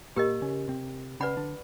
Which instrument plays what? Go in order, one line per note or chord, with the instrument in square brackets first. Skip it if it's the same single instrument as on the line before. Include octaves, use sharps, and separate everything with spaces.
[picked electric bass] A#2 A#3 [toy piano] G4 A#4 D#5
[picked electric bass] C#3 C#4
C3 C4
[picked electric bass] C#3 C#4 [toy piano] B4 D5 F#5 B5
[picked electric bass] D3 D4